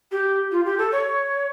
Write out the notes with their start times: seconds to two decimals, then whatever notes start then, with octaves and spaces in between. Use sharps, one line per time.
0.12 G4
0.52 F4
0.65 G4
0.78 A4
0.92 C#5